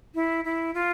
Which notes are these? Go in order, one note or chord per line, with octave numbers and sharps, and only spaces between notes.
E4
E4
F4